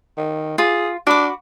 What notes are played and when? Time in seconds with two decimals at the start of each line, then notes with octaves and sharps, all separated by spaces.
0.18 D#3
0.58 F4 G#4
1.07 D4 F#4 B5 D6